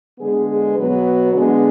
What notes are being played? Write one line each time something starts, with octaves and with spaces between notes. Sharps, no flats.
D3 G#3 B3 G#4
G#4
B2 F#3 B3 B4
D3 G#3 B3